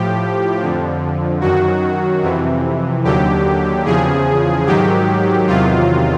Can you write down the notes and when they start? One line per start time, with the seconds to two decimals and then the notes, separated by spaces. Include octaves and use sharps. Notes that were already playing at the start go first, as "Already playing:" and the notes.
Already playing: A2 F3 G4
0.61 F2 D3 F3
1.41 F#2 D#3 F#3 F#4
2.22 F2 C3 E3
3.04 D#2 D3 F#3 G4
3.85 E2 C#3 F3 G#4
4.66 G#2 D#3 F#3 G4
5.47 E2 C3 D#3 F#3 F4